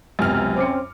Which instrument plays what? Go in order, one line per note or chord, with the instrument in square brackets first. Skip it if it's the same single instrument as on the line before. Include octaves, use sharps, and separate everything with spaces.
[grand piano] C#2 C3 B3 [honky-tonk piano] F#2 F6
[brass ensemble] C4 C#4 C5 [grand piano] D6 C#7